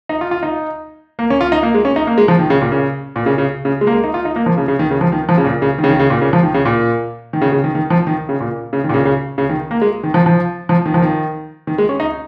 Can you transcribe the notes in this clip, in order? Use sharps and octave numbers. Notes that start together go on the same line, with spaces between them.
D#4
F4
F4
D#4
A#3
C#4
F4
D#4
A#3
G#3
C#4
D#4
A#3
G#3
F3
D#3
C#3
A#2
C#3
A#2
C#3
C#3
C#3
G#3
A#3
G#3
D#4
F4
D#4
A#3
F3
C#3
C#3
D#3
C#3
F3
D#3
F3
C#3
A#2
C#3
D#3
C#3
D#3
C#3
A#2
C#3
F3
D#3
C#3
A#2
D#3
C#3
C#3
D#3
D#3
F3
D#3
C#3
A#2
C#3
D#3
A#2
C#3
C#3
C#3
D#3
A#3
G#3
D#3
F3
F3
F3
D#3
F3
D#3
D#3
G#3
C#4
D#4